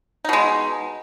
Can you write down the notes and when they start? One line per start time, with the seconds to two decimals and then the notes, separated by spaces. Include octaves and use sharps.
0.25 D#4
0.29 B2
0.33 G#3